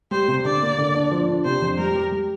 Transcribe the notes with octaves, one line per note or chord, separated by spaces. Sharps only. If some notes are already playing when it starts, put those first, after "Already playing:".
G3 C5
C3
D3 D5
A#3
D3
D4
F3
D4
C3 C5
F2
G3 A#4
G4
G3